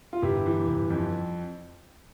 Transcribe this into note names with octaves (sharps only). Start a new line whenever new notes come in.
F4
G1 E4 G4
E3
G1
F2